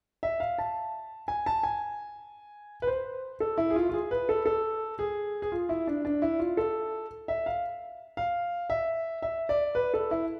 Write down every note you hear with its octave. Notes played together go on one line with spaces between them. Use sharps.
E5
F5
A5
G#5
A5
G#5
B4
C5
A4
E4
G#4
F4
F4
G#4
B4
A4
A4
G#4
G#4
F4
E4
D4
D4
E4
F4
A4
E5
F5
F5
E5
E5
D5
B4
A4
E4